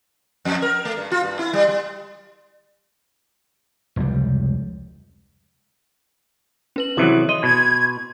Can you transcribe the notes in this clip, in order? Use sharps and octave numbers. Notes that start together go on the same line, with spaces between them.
F2
A#4
A3
G2
F4
G2
E4
G3
G3
F1 C#2 G3
C#4 B4 F#7
C3 D#3 E3 F#3 E4 D#6
D#5 C6
B2 G#6